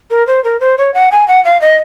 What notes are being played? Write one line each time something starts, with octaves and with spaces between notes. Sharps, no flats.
A#4
C5
A#4
C5
C#5
F#5
G#5
F#5
F5
D#5